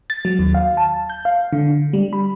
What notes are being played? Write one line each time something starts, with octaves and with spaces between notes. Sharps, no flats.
A6
F#3
D#2
F5
A5
G6
F5
D3
G3
B5